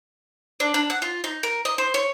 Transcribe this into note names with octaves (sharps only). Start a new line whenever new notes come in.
D4
D4
F#5
F4
D#4
A#4
D#5
C5
C#5